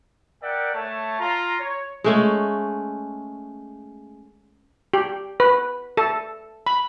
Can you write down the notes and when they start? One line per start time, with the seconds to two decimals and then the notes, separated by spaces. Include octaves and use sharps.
0.42 A#4 D5 E5 F#5 G5
0.74 A3 C#5 A5
1.20 F4 A#5
1.60 C#5
2.04 G#3 A3 C#4
4.94 G4
5.40 B4
5.97 A4
6.67 B5